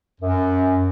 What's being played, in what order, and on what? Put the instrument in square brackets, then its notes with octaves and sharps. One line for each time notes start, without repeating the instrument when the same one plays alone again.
[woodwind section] F#2